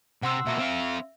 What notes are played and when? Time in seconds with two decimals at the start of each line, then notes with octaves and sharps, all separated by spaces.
0.23 C3 F#5 C6 E6
0.47 B2 A#3 E5
0.59 C4 F5